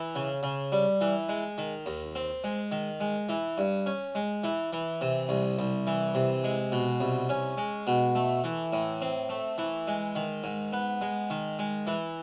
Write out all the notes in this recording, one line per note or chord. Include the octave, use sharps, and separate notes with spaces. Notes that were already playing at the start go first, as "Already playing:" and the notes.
Already playing: E3
C#3
C#3
G3
E3
G#3
D#3
D#2
C4
G#3
D#3
G#3
E3
G2
C#4
G#3
E3
E3
C3
C2
C2
E3
C3
G#3
B2
C2
C#4
G#3
B2
A3
E3
A2
C4
A3
E3
G#3
D#3
G#2
B3
G#3
D#3
G#3
E3